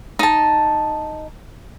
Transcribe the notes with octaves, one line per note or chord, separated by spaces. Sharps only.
D#4 A5